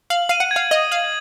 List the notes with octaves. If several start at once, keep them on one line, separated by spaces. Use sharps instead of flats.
F5 F#7
F5 D#7
F#5
G#6
F5
D#5 D#6
F5 F#7